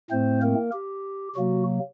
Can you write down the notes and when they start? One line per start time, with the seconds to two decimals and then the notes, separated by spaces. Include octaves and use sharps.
0.11 A2 A3 C4 C5
0.42 A#3 A#4
0.73 G4
1.35 C3 F#3 A#3 F#4